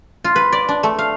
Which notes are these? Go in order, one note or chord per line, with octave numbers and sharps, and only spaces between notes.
F4
B4
D5
D4
A3
F5